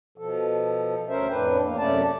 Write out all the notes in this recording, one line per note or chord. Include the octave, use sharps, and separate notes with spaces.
B2 F3 A4
D2 C#4 A#4 C5 E5
F2 A2 D4 B4 G5
E2 A#3
F#2 C3 A3 C#4 D5 A5